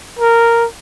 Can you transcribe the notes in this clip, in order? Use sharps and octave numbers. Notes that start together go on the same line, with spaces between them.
A#4